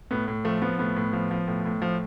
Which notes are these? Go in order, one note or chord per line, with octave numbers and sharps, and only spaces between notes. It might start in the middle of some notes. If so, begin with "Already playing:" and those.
A2 B3
A2
F3 A3
F3 B3
A2 B3
A2
F3
F3
A2
A2
F3